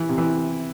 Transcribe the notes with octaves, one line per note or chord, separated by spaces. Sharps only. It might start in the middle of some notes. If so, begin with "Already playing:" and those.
Already playing: E3
C3
E3